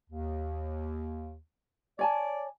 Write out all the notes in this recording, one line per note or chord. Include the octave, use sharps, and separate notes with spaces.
D#2
C#5 D5 G#5 A5